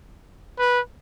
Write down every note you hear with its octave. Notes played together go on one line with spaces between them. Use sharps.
B4